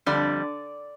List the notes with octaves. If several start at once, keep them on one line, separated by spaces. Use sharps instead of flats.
F2 D3 G3 D5